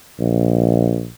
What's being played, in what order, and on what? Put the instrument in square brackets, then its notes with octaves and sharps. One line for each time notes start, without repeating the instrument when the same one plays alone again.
[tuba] A#1